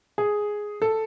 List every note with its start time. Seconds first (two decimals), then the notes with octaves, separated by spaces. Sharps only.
0.18 G#4
0.82 A4